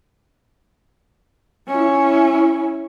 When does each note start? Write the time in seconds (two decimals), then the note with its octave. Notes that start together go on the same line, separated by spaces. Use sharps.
1.68 C#4 E4